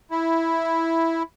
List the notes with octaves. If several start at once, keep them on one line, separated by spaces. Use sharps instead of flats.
E4